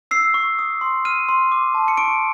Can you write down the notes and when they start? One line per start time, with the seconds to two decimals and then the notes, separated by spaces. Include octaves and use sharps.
0.11 E6 C7
0.34 C#6
0.59 D#6
0.81 C6
1.05 F6 D#7
1.29 C6
1.52 D6
1.74 A5
1.88 C#7
1.97 C#6 D7